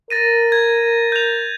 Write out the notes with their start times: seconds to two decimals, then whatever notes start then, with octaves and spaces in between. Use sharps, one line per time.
0.10 A#4 A6 A#6 D#7
0.52 G#6
1.12 G6 F7